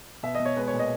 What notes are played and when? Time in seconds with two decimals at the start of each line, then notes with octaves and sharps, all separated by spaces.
0.23 B2 E5
0.35 B2 D#5
0.45 C#5
0.57 G#3 B4
0.68 C#5
0.73 A#2
0.79 D#5